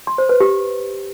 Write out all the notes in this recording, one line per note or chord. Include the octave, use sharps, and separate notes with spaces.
C6
C5
B4
G4